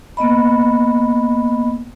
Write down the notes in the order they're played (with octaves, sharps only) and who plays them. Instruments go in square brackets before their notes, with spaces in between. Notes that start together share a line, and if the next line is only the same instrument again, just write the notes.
[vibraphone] A#3 B3 D#5 B5